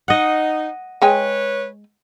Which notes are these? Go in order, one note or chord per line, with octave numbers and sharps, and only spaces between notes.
D#4 D#5 F#5
G#3 B4 C#5 G5 G#5